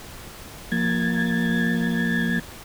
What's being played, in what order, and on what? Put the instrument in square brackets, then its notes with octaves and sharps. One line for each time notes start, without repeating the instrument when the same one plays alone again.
[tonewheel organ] F3 A#3 G#6 A6